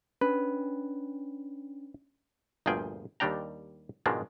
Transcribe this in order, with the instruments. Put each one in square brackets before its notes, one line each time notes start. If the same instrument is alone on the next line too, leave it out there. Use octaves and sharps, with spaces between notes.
[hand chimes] C#4 D4 [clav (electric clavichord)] B4
[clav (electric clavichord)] G1 D2 A#2 F3 G#4 G5
D#2 D#3 G3 D4 G5 A#5
G#2 B2 D#3 F3 G#3 D4